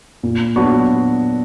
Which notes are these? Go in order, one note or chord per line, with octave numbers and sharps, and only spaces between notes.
A#2
F#3 B3 D4 F#4